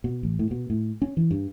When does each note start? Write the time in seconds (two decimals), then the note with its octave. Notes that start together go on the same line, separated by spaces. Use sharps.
0.04 B2
0.23 A1
0.39 A2
0.51 B2
0.70 A2
1.02 C#4
1.17 E3
1.31 G2